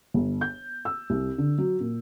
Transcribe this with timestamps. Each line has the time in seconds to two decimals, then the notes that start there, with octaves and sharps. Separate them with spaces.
0.14 G1
0.41 G6
0.85 E6
1.10 C2
1.38 D3
1.58 F#3
1.80 A#2